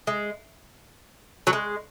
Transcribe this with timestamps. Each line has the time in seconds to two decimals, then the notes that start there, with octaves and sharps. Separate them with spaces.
0.07 G#3
1.47 F#3
1.53 G#3